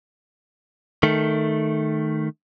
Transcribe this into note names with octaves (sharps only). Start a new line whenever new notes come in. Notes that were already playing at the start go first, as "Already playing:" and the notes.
D#3 A3